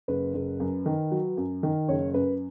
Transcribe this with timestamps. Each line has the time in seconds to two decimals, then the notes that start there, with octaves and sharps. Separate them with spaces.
0.08 F#1 B4
0.34 F#1
0.60 F#2
0.86 D#3
1.11 F#3
1.37 F#2
1.63 D#3
1.89 F#1 C#5
2.14 F#2 B4